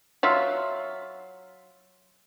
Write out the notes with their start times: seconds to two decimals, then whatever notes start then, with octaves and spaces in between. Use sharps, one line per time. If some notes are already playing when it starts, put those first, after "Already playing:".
0.23 F#3 F4 E5